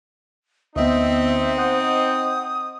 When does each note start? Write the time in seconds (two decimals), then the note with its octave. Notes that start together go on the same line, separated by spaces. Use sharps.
0.76 D2 B3 C4 D#4 D#5 E5
1.57 C5 F#5 D#6 G6